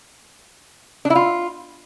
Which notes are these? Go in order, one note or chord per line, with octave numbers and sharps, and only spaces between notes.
D4
E4
F4